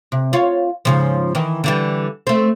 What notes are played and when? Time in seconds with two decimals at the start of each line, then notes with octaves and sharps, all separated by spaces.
0.12 C3
0.33 F4 C#5
0.85 G#2 C#3 F3
1.35 D#3 E3
1.64 D3 E3 G3
2.27 A3 C4